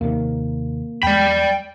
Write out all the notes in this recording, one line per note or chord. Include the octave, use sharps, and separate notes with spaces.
D#2 C3 D#3 A#3
E2 G#3 D5 G5 B5